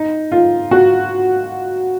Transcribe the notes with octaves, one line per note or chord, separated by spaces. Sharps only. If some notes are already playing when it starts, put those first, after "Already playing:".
Already playing: D#4
F4
F#4